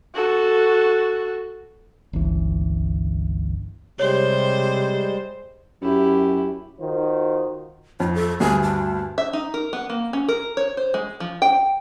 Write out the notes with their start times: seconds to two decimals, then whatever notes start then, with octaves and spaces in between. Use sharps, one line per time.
0.15 F#4 A4
2.13 G1 C#2 E3
4.00 C3 G3 G#3 C5 C#5
5.82 F#2 E4 G4
6.80 D#3 F4 F#4 C5
8.00 F2 F4
8.15 A4
8.40 D2 G2 G#5
8.63 A5
9.18 E5
9.33 D#4
9.54 A#4
9.73 B3
9.90 A#3
10.13 C#4
10.28 A#4
10.57 C#5
10.77 C5
10.94 G#3
11.20 F3
11.42 G5